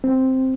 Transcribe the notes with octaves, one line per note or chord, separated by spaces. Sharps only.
C4